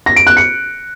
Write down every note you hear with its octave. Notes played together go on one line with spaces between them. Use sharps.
A#6
D7
F#6
C#7